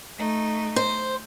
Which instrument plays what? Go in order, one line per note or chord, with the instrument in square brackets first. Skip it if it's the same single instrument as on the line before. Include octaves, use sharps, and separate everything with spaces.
[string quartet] A3 D#4
[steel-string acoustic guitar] C5